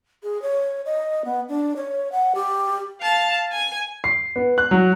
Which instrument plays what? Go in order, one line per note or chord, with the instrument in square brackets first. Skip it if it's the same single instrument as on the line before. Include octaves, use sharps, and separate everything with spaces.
[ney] G#4
C#5
D#5
B3
D4
C#5
F#5
G4
[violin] F5 A5
G#5
[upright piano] C7
B3
F#6
F#3